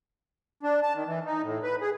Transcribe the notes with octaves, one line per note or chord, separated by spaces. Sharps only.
D4
A5
D#3
E3
D#4
A2
B4
G#4